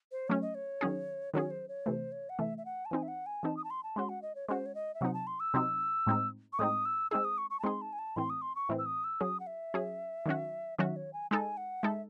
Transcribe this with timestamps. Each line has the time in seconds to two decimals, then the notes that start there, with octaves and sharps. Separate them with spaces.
0.12 C5
0.28 F#3 A3 C#4 C#5
0.42 D#5
0.55 C#5
0.81 D#3 F#3 C#4 G#4
1.34 D#3 F#3 C#4 G#4 C#5
1.51 C5
1.68 C#5
1.86 C3 E3 A3 C5
2.12 C#5
2.29 F#5
2.39 C3 E3 A3 E5
2.58 E5
2.65 F#5
2.85 A5
2.91 E3 C4 D#4 G#5
3.03 E5
3.08 F#5
3.26 G#5
3.43 E3 C4 D#4 A5
3.57 D#6
3.64 A5
3.70 C6
3.83 A5
3.96 G#3 C#4 F#4 C6
4.09 F#5
4.22 D#5
4.35 C#5
4.48 G#3 C#4 F#4 C5
4.66 C#5
4.75 D#5
4.94 E5
5.01 C3 F#3 C4 D#4 F#5
5.14 A5
5.27 C6
5.40 E6
5.54 C3 F#3 C4 D#4
6.07 A2 G#3 C4 D#4
6.53 C#6
6.59 A2 G#3 C4 D#4 D#6
6.85 E6
7.11 G#3 C4 D#4 G#4 E6
7.24 D#6
7.38 C#6
7.50 C#6
7.60 A5
7.63 G#3 C4 D#4 G#4 C6
7.82 A5
7.93 G#5
7.99 A5
8.16 A2 E3 C4 C6
8.30 D#6
8.42 C6
8.55 C#6
8.69 A2 E3 C4
8.79 E6
8.86 D#6
9.04 E6
9.21 F#3 C#4 G#4 D#6
9.40 F#5
9.47 E5
9.74 F#3 C#4 G#4
10.26 D#3 F#3 C#4 F#4
10.79 D#3 F#3 C#4 F#4 E5
10.96 C#5
11.13 G#5
11.31 G#3 D#4 A4 G#5
11.57 F#5
11.83 G#3 D#4 A4 E5